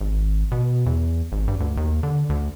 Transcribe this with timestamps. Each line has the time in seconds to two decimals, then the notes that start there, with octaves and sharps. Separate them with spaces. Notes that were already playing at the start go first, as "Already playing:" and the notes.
0.01 G#1
0.52 B2
0.86 E2
1.32 G#1
1.48 G2
1.60 D2
1.77 D#2
2.03 D3
2.29 D2